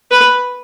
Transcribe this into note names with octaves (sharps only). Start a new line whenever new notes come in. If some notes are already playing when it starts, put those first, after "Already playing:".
B4